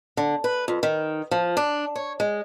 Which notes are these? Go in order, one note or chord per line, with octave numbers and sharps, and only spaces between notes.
D3
B4
F2
D#3
F3
D4
C#5
G#3